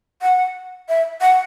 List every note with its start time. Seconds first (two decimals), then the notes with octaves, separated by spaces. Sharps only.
0.22 F#5
0.89 E5
1.21 F#5